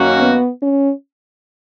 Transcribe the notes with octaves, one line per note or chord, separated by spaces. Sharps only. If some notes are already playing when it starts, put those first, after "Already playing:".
Already playing: F#2 D#3 A#3 C#4 F#4
B3
C#4